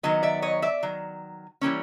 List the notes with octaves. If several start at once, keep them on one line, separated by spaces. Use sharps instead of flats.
D#3 F#3 B3 D#5
D5 E5
C#5 D#5
D5 E5
D#3 F#3
E3 G3 A#3 C#4